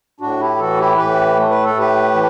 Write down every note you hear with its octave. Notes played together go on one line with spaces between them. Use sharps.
A2 D4 F#4
E4 G4
E3 F#4 A4
E4 G4
A2 G4 B4
A3
B4
A4
A2 G4 B4
E3